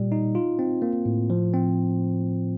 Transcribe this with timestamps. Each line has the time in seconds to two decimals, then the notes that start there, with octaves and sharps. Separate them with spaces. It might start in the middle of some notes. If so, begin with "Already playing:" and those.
Already playing: A#2 G3
0.12 D#4
0.35 F4
0.59 C4
0.82 A#3
1.06 A2
1.30 F3
1.54 C4